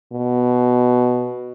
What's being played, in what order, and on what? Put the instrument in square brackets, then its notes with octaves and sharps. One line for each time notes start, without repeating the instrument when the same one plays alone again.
[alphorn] B2